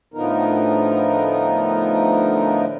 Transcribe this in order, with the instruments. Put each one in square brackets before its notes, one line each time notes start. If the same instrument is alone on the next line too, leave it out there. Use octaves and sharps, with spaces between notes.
[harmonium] A2 D3 F3 B3 D#4 A#4